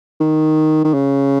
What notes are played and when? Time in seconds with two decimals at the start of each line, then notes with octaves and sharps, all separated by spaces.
0.20 D#3
0.84 D#3
0.94 C#3